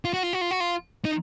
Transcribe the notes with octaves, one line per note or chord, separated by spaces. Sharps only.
F4
F#4
F4
F#4
F4
F#4
F4
D#4